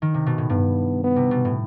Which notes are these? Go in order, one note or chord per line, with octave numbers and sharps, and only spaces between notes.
D#3
C3
B2
A2
G2 B3
B3
C3
B2
A2